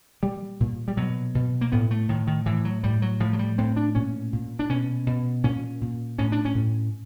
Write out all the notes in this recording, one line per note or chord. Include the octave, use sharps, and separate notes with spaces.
A#2 G3
A#2
G3
B2 F#3
B2
A#3
A2 B3
A3
A2 D#3
D#3
A2 E3
F#3
A2 G3
F#3
A2 F3
F#3
G3
A2 C4
D4
A#2 C#4
A#2
D4
B2 C#4
B2
A#2 C#4
A#2
A2 C#4
D4
C#4
A2